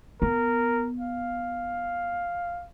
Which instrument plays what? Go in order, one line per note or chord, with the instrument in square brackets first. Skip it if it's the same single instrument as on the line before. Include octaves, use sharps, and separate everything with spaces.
[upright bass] B3 [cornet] A#4
[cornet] F5